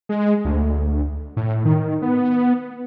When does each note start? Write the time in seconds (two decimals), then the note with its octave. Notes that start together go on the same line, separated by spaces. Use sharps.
0.09 G#3
0.45 D2
1.37 A2
1.65 D#3
2.02 B3